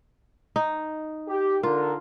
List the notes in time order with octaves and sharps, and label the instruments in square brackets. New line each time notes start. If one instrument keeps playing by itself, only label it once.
[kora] D#4
[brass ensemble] G4
[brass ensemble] D3 A#4 [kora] F4